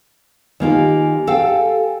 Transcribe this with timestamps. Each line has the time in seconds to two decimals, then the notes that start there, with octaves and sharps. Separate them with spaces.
0.60 D#3 A#3 F4 G4 G#5
1.27 A4 F5 G5